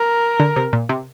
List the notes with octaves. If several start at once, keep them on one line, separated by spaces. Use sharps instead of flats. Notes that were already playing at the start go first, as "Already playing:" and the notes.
Already playing: A#4
D3
C3
A#2
C3